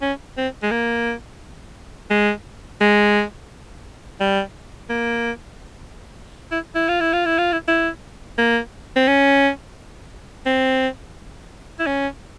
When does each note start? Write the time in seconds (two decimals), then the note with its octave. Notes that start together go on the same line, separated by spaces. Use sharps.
0.02 C#4
0.37 C4
0.63 G#3
0.71 A#3
2.10 G#3
2.81 G#3
4.20 G3
4.90 A#3
6.52 E4
6.75 E4
6.89 F4
7.00 E4
7.13 F4
7.26 E4
7.38 F4
7.52 E4
7.68 E4
8.38 A#3
8.96 C4
9.08 C#4
10.46 C4
11.79 E4
11.86 C#4